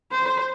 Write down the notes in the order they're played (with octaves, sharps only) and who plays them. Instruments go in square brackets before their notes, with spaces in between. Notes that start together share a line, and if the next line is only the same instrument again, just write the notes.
[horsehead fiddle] C5